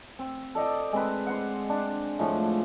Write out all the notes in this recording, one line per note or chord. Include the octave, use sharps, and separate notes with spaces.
C4
A4 D5 D#5 G5
G#3 C4 B4
C5 F#5
D4
A2 F3 G#3